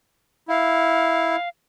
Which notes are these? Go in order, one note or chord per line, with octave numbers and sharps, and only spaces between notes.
E4 F5